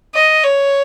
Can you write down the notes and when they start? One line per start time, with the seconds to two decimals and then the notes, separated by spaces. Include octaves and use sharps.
0.14 D#5
0.44 C#5